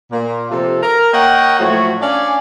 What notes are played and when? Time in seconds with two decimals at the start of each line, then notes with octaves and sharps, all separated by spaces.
0.12 A#2 A#3
0.51 C3 F3 A4
0.83 A#4
1.13 A#3 C#5 D#5 F#5 G5
1.59 A2 F3 F#3 A3 F#4 C#5
2.01 C#4 D4 D5 F5 G#5